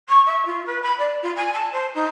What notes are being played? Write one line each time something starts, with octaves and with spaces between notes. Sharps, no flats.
C#6
E5
F4
B4
B5
D5
F4
G#5
A5
C5
D#4